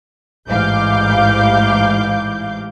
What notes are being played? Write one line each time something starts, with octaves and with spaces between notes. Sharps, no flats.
A1 G#2 E3 F5 D6 G6